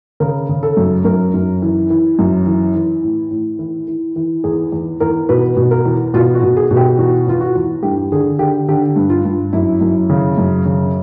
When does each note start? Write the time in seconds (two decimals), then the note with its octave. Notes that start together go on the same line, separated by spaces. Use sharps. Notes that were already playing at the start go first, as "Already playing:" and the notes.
0.20 C#3 A#4
0.49 C#3
0.63 A4
0.77 F#2
1.05 F#2 A#4
1.34 F#2
1.62 E3
1.90 E3
2.19 F#2
2.46 E3
2.75 E3
3.03 A2
3.31 A2
3.59 E3
3.88 E3
4.16 E3
4.44 E2 G#4
4.72 E2
5.00 E2 A#4
5.29 B2 B4
5.57 B2
5.71 A#4
5.86 E2
6.14 B2 F4
6.35 F#4
6.43 B2
6.57 G#4
6.71 B2
6.77 G4
6.98 E2 F#4
7.27 E2 F4
7.41 F#4
7.55 E2
7.83 G2 G4
8.12 D3 G#4
8.39 D3 G4
8.68 D3 G4
8.96 G2
9.10 F4
9.25 G2
9.53 F#2 E4
9.81 F#2
10.10 C#3
10.38 F#2
10.65 C#3